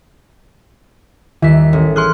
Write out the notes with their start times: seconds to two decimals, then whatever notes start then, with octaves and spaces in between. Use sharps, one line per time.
1.42 D#2 D#3 G3 E5 B6
1.73 A1
1.96 G#4 C6 F6 F#6